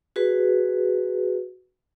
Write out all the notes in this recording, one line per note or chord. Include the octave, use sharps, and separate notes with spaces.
F#4 G#4 B4